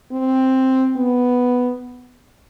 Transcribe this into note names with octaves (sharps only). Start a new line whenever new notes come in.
C4
B3